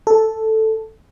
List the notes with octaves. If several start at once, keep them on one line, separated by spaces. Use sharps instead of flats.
A4